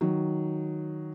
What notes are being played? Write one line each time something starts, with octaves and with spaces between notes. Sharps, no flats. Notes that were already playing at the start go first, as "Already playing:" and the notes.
D#3 F#3